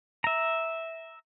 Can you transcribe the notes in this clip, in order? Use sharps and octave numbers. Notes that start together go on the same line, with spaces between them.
E5 A#5